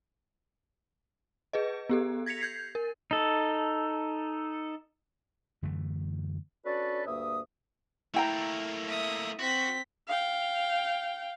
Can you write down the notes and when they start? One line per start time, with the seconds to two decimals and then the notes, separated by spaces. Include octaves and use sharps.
1.53 G#4 B4 D#5
1.89 B3 G4 A4
2.26 G#6 A#6 B6 C#7 F7
2.41 G6 G#6 C7
2.75 A#4
3.11 D#4 A4
5.62 F#2 D3 E3 A3
6.64 C#4 D4 F#4 A4 B4 D5
7.06 D2 G2 A#3 E5 D#6
8.14 A3 A#3 E4 G5 A#5
8.86 E5 D#6
9.40 C4 F#4 B6
10.07 F5 G5